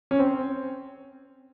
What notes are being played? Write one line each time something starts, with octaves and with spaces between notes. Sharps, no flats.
C#4
C4